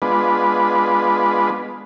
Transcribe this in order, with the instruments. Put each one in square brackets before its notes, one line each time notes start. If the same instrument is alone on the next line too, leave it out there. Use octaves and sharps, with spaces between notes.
[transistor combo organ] G#3 B3 D4 F4 B4